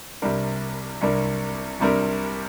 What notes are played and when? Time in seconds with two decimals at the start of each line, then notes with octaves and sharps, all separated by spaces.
0.22 C2 C3 G3 D4 A#4
1.01 C2 C3 G3 D4 A#4
1.80 C2 C3 G3 D4 A#4